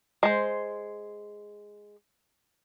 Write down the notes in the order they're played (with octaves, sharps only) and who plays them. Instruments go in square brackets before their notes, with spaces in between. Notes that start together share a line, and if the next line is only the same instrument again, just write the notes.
[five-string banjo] G#3 C5